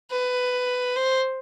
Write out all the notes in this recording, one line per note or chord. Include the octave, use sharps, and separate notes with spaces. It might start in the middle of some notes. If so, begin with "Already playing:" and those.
B4
C5